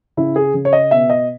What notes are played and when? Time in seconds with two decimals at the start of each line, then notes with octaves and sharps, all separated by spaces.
0.17 C#3 E4
0.36 G#4
0.54 C#3
0.65 C#5
0.73 D#5
0.91 B2 E5
1.10 D#5